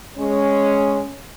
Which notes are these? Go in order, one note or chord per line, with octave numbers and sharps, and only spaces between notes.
G#3 C#4